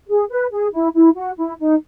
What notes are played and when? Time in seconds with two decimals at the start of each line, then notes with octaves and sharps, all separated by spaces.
0.08 G#4
0.30 B4
0.52 G#4
0.73 E4
0.94 E4
1.16 F#4
1.38 E4
1.59 D#4